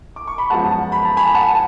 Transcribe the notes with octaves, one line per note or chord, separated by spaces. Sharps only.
D6
C#6
B5
F#2 F3 G#3 B3 F#5 A5
B5
A5
G#5 B5
F#5 A5